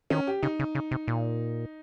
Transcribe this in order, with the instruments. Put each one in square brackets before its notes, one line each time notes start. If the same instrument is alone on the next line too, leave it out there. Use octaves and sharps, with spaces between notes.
[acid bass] D#3 [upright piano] C#4
[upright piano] G4
[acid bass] C#3 [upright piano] D#4
[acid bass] C#3
C#3
C3
A#2